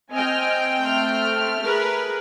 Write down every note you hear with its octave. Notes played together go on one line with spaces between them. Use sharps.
C4 D#5 G5 G#5 F6
A3 F6
G#4 A#4 B4